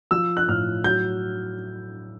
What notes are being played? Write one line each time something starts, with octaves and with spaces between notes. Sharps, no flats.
F3 E6
F#6
A2 F6
F#3 G6